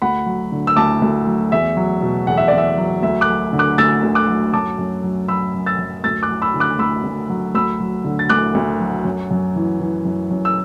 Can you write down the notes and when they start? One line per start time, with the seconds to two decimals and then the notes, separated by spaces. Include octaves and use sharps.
0.02 D2 F#5 B5
0.26 F#3
0.52 D3
0.67 E6
0.76 D2 A5 D6
1.02 D2
1.27 F#3
1.52 E2 E5
1.77 F#3
2.02 B2
2.27 E2 F#5
2.37 E5
2.48 E2 D5
2.58 E5
2.78 F#3
3.03 D2 E5
3.21 D6 F#6
3.28 F#3
3.53 D3
3.59 D6 F#6
3.78 D2 E6 A6
4.03 D2
4.15 D6 F#6
4.28 F#3
4.53 F#2 A5 D6
4.78 F#2
5.04 F#3
5.28 F#3 B5 E6
5.54 F#2
5.66 E6 A6
5.79 F#2
6.04 D2 E6 A6
6.23 D6 F#6
6.29 F#3
6.42 B5 E6
6.54 D3
6.60 D6 F#6
6.79 D2 B5 E6
7.04 D2
7.30 F#3
7.55 D2 B5 E6
7.80 F#3
8.05 D3
8.19 A6
8.29 D2 D6 F#6
8.55 D2
8.80 F#3
9.05 F#2
9.31 F#2
9.56 E3
9.80 E3
10.05 F#2
10.31 F#2
10.45 E6